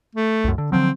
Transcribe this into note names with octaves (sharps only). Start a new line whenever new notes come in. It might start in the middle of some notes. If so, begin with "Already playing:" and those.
A3
C2 F#2
D3
D3 F3 F#3 C4